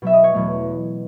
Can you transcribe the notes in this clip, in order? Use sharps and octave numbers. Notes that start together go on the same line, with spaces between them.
B2 F#3 B3 E5
D#5
C#5
E2 B2 F#3 A3